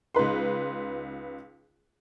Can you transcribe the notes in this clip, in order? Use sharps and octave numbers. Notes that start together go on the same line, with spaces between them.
C#2 D#4 B4 C6